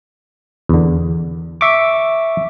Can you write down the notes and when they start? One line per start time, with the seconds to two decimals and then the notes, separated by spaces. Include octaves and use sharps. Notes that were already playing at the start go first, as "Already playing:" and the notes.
0.69 E2 D3
1.61 E5 C#6 D6